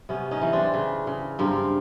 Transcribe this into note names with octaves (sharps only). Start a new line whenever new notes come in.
C3 B3 C#4
C#4 D#4
E3
C4 D4
C#3
C#3
G2 A#3 C4